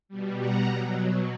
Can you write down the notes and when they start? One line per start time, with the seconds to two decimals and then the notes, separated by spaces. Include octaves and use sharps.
0.09 B2 G3
0.38 F#5 A#5
0.69 B2 F#3